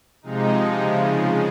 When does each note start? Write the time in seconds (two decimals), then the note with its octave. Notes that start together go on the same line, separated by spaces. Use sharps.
0.22 C3 F3 G#3 D#4
0.81 C#3 F3 G#3